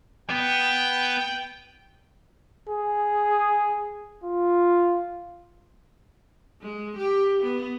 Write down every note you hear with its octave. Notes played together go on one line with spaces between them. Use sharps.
B3 G5
G#4
F4
G#3
G4
B3